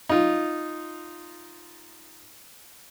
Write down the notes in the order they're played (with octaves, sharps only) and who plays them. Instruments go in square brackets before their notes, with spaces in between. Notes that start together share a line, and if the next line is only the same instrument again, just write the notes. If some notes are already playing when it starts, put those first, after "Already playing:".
[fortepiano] D#4 F4